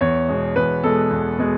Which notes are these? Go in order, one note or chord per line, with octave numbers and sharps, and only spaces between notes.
E2 C#5
B2 G#3
E2 B4
B2 G#3 A4
E2
B2 G#3